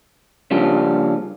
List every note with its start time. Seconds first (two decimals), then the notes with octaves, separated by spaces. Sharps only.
0.51 C#3 F3 G3 A#3 C#4 D4